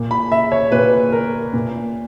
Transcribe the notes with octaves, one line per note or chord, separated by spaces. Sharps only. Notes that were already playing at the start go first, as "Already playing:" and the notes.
Already playing: A#2
B5
E5
C#5
A#2 B4
A#4
A#2